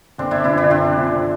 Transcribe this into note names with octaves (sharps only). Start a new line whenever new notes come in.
G1 C4 D4
D4 E4
F#2 D3 F3 D4 E4
D4 E4
G1 C4 D4
F#2 D3 F3